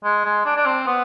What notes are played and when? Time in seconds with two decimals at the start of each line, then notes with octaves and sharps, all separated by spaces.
0.04 G#3
0.25 G#3
0.45 D4
0.56 D4
0.66 C4
0.87 B3